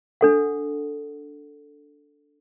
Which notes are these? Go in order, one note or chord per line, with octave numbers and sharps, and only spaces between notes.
D4 A4 F#5